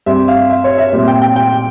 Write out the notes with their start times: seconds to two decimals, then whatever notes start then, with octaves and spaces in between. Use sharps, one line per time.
0.06 G2 G3 C4 E5
0.28 F5
0.49 E5
0.64 C#5
0.78 E5
0.93 A#2 G3 C4
1.08 G5
1.22 G5
1.36 G5